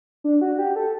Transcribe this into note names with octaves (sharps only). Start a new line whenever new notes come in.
D4
F#4
G4
A4